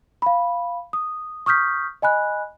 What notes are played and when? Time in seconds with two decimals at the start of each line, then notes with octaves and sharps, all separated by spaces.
0.22 F5 B5
0.93 D#6
1.46 C#6 D#6 F6 G6 B6
2.02 D#5 G#5 B5 F#6